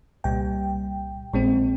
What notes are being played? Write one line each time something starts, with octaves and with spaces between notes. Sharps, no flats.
C2 A#2 G3 G5
A#1 A#2 G#3 C4